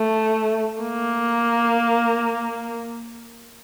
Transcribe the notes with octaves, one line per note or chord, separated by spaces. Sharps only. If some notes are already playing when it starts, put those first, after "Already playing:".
Already playing: A3
A#3